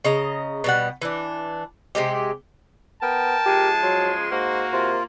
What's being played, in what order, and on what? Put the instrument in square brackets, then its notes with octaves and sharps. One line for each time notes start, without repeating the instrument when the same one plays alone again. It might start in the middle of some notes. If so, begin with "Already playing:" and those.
[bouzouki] C#3 D#5 A#5
B2 G3 F#5
E3 D4
C3 E3 G#3 G4
[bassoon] B3 [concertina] A#4 G5 [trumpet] A5
[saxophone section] C#3 F3 G#3 [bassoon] G4
[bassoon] F#3 [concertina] C6
[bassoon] G#2 [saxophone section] A#3 [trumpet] F#4
[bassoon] C3 [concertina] F4